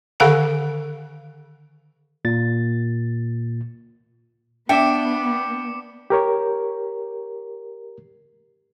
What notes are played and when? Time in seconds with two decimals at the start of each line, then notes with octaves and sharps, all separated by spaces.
0.20 D3 D#3 G#4 F5 F#5 G#5
2.25 A#2 A6
4.69 B3 D4 E5 G5 D6 C#7
6.10 G4 A#4 C#5